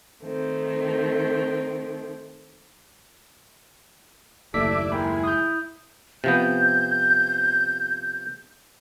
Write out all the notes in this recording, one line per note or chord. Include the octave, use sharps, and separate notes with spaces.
D#3 A3 C4
F#1 D#2 A3 E4 A4 D5 B6
G#3 E4 A#4 G5 B5
D#6 G6
C3 F3 B3 G6